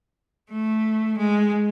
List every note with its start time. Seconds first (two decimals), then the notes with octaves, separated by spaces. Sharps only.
0.51 A3
1.17 G#3